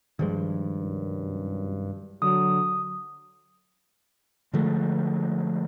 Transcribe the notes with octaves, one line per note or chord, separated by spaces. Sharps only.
G2 D#3 F3 G#3
C2 F#2
D3 F#3 D#6
D3 F3 G#3 A3